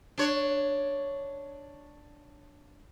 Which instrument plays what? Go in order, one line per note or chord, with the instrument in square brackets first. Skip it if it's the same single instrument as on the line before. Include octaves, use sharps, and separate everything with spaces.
[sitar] D4 C#5